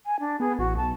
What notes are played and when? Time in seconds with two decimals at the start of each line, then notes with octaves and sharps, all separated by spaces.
0.06 G#5
0.20 D4
0.40 B3 G#4
0.59 A1 F#4
0.77 B1 A5